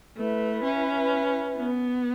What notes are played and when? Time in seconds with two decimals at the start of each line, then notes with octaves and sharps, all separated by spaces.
0.17 A3 E4 B4 E5 B5
0.64 C#4
1.57 B3